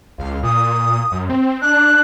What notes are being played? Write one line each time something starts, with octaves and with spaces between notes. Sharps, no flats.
C#2 F5
A#2 D#6
F#2
C4
D4 F#6